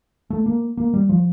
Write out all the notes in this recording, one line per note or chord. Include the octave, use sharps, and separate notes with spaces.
A3
A#3
A#3
G3
F3